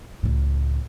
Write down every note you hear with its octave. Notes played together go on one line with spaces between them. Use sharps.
C#2 A2